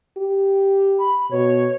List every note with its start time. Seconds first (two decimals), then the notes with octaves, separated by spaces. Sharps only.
0.17 G4
0.99 B5
1.31 B2 C#5